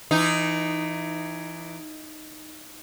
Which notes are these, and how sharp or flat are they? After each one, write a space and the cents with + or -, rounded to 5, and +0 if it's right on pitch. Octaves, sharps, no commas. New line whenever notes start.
E3 +20 D#4 -10